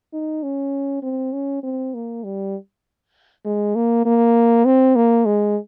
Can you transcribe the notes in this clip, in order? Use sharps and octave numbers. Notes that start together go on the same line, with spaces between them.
D#4
C#4
C4
C#4
C4
A#3
G3
G#3
A#3
A#3
C4
A#3
G#3